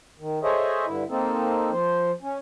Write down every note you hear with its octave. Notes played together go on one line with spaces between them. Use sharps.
D#3
G#4 A4 C5 C#5 D#5 E5
G2 D3 E4
A#3 C4 D#4 A4
F3 C5
C#4